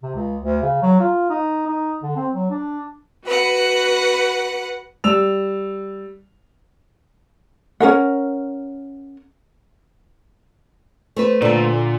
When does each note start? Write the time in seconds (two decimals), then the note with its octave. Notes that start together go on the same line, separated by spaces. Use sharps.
0.03 C3
0.15 C#2
0.42 D2
0.62 C#3
0.82 F#3
1.00 F4
1.30 D#4
1.67 D#4
2.03 D3
2.16 C4
2.34 F#3
2.51 D4
3.24 F#4 B4 F#5
5.04 G3 E6 F7
7.80 C#4 G#4 A#4 F#5
11.16 A3 C4 B4
11.42 A#2 D3 A4